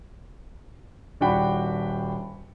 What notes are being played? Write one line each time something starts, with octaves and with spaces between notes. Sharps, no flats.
D#1 D4 F#4 G5 B5